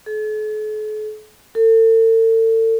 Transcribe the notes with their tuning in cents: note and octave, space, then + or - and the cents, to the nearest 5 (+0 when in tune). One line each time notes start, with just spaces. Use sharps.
A4 -45
A4 +40